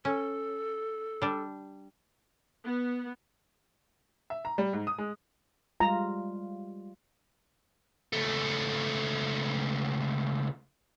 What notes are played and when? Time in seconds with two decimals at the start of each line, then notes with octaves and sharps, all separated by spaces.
0.05 C#4 A4
1.22 G3 D4
2.66 B3
4.30 E5
4.45 A#5
4.58 G3
4.73 G#2
4.87 D#6
4.98 G#3
5.80 G3 G#3 F4 A#5
8.13 C#2 A3